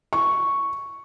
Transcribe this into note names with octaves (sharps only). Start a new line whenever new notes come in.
C#6